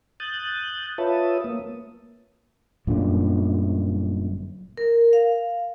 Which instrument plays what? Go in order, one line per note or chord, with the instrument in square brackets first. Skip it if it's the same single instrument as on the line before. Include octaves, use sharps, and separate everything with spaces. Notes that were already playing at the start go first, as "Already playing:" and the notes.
[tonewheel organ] D#6 F#6 G6 A6
F4 B4 C#5 E5 A5 D#6
A#3
[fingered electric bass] G1 F#2 A#2 D3
[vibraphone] A#4
F5